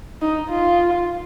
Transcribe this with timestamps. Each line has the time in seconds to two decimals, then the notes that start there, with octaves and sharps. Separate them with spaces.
0.22 D#4
0.50 F4